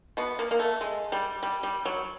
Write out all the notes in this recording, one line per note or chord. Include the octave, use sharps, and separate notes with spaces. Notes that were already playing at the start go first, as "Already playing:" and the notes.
B2 B3
A#3
A#3
A3
G#3
G3
G3
G3
F#3